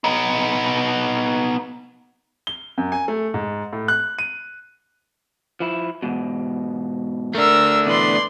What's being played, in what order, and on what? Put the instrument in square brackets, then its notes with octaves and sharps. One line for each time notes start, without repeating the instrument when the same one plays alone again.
[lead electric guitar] B3 D#4
[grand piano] G7
F#2
G#5
A3
G#2
A2
F#6
D#7
[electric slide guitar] F3 E4
E2 G#2 B2
[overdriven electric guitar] A3 D4 [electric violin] A#4 E6
[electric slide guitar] B2 E3 B4 [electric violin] D5 C6